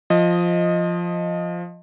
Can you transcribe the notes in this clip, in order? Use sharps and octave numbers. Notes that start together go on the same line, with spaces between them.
F3 D#5